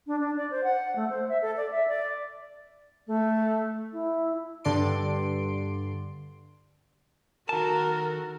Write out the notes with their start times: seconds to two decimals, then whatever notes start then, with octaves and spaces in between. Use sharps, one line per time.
0.07 D4
0.20 D4
0.37 D5
0.51 C5
0.64 F#5
0.96 A3
1.10 C5
1.29 E5
1.42 A4
1.57 D5
1.72 E5
1.88 D5
3.07 A3
3.92 E4
4.65 G2 D3 D5 C6 D7
7.49 D#3 F#4 A4 A#4 A5